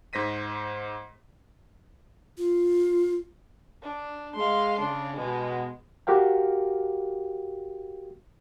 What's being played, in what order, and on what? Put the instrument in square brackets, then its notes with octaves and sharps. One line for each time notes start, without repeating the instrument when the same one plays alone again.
[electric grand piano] G#2 C5 A#6 B6 D#7
[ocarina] F4
[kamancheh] D4
[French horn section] G#3 [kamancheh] F5 C6
[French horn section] C#3 [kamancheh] D4
[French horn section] B2 [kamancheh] G#3
[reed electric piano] F#4 G4 A#4 F5 G5